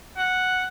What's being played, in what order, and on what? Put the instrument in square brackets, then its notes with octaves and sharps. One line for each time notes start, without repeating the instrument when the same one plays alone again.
[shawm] F#5